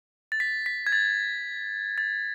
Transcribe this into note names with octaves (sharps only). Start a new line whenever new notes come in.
A6
B6
B6
G#6
A6
A6